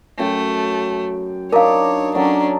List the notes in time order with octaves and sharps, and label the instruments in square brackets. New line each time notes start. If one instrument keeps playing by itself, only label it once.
[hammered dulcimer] F#2 G5 [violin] A3
[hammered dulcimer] D4 D#4 D6 [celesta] A#4 F5 [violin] C#5
[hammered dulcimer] F#3 A4 A#5 [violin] C#4 D4